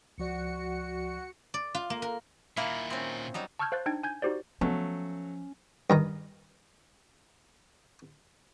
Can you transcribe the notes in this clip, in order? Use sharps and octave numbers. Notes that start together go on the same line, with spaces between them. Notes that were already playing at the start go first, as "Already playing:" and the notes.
C#2 F3 F#4 D5 C#7
D5
F4
A#3
A#4
A#2 D#3 A#3 E4
C4 C#4
F#3 G3 D#4
A5 C#6 E6 F6 G6 G#6
C5 F5 F#6 G6 A6
D4 D#4 G5 G#6
G#5 G6 G#6
D#4 F#4 G4 C5 D5
F3 F#3 A3 B3 C#4
G2 D#3 A#5